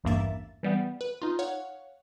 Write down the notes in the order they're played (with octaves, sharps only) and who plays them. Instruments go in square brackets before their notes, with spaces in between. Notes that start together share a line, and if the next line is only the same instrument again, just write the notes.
[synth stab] A1 E2 G2 A#3 E5 A6
E3 G3 B3
B4
D#4 F4
C#5 F5 F#5